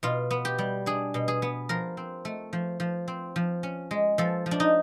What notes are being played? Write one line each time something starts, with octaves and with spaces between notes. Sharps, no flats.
B2 F4
B3
G4
G3
D4 G#4
B2
G#4
B3
F3 A#4
C4
A3
F3
F3
C4
F3
C#4
G#3
F3 A4
F3
D4
D#4